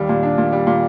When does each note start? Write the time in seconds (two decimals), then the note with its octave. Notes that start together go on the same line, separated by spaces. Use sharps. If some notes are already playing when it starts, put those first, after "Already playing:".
Already playing: D#2 G3
0.09 A#2
0.23 D4
0.38 A#2
0.53 G3
0.67 A#2